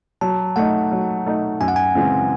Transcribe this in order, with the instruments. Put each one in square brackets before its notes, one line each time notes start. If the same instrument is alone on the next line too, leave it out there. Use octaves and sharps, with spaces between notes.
[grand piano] F#3 [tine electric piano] A5
[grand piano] A3 D#4 [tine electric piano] F#5
[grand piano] F#3
A3 D#4
[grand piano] F#2 [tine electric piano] G#5
[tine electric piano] F#5
G#5
[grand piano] C#3 E3 G#3 C4